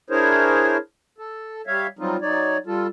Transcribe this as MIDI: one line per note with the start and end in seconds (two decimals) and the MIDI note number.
0.10 0.77 62
0.10 0.77 64
0.10 0.77 68
0.10 0.77 70
0.10 0.77 72
0.10 0.77 73
1.18 1.62 69
1.67 1.87 55
1.67 1.87 73
1.67 1.87 76
1.67 1.87 77
1.99 2.17 54
1.99 2.17 55
1.99 2.17 60
1.99 2.17 63
1.99 2.17 65
2.22 2.58 54
2.22 2.58 63
2.22 2.58 73
2.22 2.58 74
2.66 2.87 55
2.66 2.87 65
2.66 2.87 69